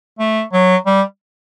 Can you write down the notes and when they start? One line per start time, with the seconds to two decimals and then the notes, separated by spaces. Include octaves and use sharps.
0.19 A3
0.53 F#3
0.86 G3